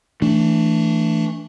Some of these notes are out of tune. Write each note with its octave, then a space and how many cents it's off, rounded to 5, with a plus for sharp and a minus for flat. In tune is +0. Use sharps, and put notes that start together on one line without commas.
E3 +0 A3 +15 D4 +0